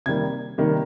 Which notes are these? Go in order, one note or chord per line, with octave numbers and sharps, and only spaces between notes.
C3 D#3 G3 A#3 G#6
C3 D#3 G3 A#3